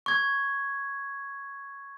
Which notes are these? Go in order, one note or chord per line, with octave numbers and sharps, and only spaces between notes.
C#6 G#6